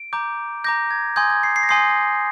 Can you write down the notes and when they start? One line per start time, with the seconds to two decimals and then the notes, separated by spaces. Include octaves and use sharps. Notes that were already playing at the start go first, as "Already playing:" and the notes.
Already playing: D7
0.13 A#5 D6 G6
0.64 A#5 D6 G6 A#6
0.91 G#6
1.16 G#5 C6 D#6 G6 G#6
1.30 G#6
1.43 C7
1.56 C7
1.63 A#6
1.69 G#5 C6 D#6 G6 C7